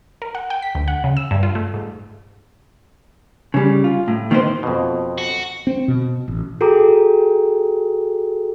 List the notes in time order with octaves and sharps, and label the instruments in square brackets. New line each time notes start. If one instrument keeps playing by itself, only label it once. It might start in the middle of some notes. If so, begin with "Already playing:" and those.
[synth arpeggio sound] A#4
F#5
G5
B6
D2
F#5
C#3
E6
G2
F4
A3
G#2
[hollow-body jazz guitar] C#3 G3
F4
A2
D#3 A#3 B3 D#4 C5
[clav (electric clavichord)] F2 B2
[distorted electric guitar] F#4
[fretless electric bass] C4
B2
A1
[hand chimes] F#4 G#4 A4 G5 A#5 D6